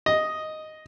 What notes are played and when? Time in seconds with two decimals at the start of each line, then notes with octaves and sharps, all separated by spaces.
0.06 D#5